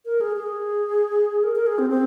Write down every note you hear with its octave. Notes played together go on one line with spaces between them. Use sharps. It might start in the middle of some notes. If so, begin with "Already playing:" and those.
A#4
G#4
G#4
A#4
A#4
G#4
C4
C4